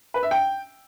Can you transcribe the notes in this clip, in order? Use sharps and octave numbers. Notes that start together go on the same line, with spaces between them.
B4
E5
G5